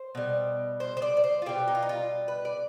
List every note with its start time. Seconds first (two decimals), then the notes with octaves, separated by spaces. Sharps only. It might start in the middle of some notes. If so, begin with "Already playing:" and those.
Already playing: C5
0.15 B2 G3
0.80 C5
0.97 C5
1.02 D5
1.17 D5
1.24 C5
1.42 F4
1.46 B2 G3 G4
1.68 D#4
1.75 F4
1.82 D#4
1.89 F4
2.28 B4
2.45 D5